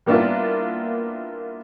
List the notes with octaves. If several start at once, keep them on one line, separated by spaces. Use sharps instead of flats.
G3 A#3 B3 D4 E4 F4